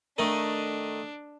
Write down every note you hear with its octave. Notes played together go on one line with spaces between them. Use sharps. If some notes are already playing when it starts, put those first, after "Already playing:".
D#3 A3 D4 D#4